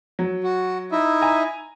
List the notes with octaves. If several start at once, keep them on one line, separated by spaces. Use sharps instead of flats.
F#3
F#4
D#4 E4 E5
G#5 A#5